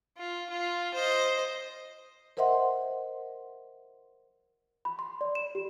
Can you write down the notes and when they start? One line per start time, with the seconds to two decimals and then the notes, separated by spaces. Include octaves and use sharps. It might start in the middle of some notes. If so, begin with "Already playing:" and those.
0.18 F4
0.50 F4
0.94 C5 D#5
2.37 A#4 C5 D#5 E5 F#5 C6
4.85 B5
4.99 C6
5.21 D5
5.35 E7
5.55 G4